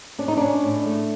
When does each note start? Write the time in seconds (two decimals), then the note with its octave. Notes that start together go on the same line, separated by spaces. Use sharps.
0.19 C#4 D4
0.28 D#4
0.37 C#4 D4
0.64 A2
0.86 A3